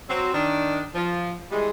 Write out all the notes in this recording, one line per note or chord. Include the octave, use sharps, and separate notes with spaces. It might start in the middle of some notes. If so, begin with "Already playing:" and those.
F#3 C4
D#3 D4
F3
E3 G3 G#3